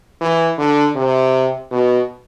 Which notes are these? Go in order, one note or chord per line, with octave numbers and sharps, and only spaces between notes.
E3
D3
C3
B2